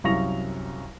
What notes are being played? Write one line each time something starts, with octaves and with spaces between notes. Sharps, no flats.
C2 F#2 F5 C#6 A#6 F7